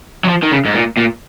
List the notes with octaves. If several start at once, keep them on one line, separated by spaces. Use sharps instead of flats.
F#3
F3
D#3
C#3
G#2
A#2
A#2